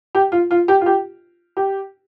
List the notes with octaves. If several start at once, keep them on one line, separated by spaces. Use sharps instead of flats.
G4
F4
F4
G4
F4
G4
G4